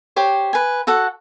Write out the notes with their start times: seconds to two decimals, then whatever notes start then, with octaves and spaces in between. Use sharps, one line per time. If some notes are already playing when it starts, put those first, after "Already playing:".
0.16 G4 C5 C#5
0.53 B4 G#5
0.87 F#4 A4 F#5